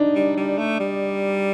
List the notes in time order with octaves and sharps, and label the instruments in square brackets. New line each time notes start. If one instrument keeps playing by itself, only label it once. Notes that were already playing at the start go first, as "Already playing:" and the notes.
Already playing: [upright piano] D4 D#4
[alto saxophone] G3
G3
A3
G3